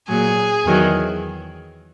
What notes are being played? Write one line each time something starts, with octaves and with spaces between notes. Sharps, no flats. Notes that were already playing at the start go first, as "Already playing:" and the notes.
A#2 F#3 G#4
E2 D#3 F#3